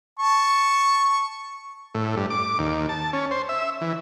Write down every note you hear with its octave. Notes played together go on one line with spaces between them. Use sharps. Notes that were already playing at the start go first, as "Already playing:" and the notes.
A5 C#6
A2
G2
D6
D#2
A5
C#4
C5
E5
E3